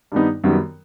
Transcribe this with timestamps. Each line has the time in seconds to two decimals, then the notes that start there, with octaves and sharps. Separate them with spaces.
0.12 G2 D#3 G3 B3 D#4
0.44 F#2 D#3 G3 B3